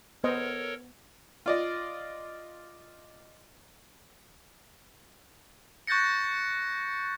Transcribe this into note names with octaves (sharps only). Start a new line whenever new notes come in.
B3 A4 A#4 C5 C#5 D#5
F4 D5 D#5
C#6 F#6 G6 A6 A#6 C#7